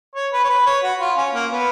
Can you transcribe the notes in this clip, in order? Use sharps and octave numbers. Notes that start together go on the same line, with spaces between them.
C#5
B4
C#5
B4
C#5
F#4
F4
C#4
A#3
B3